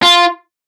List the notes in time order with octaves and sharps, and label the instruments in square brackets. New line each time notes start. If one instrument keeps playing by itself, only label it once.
[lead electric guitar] F4